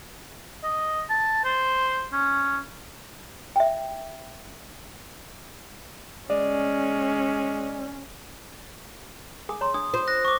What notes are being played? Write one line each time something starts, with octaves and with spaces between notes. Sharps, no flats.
D#5
A5
C5
C#4
E5 G5
G#3 C#4 D5
G#4 G#5 D#6
C#5 A#5 C6
D4 D#6
F4 C5
F#6 A#6
C#6 D6